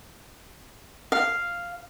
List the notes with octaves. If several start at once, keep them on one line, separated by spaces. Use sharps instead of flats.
F5